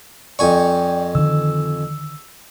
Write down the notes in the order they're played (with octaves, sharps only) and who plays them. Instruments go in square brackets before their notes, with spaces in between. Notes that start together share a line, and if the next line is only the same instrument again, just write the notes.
[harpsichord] F2 G#5 C#6 [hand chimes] D5 G5
[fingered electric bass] D3 D#3 [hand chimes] E6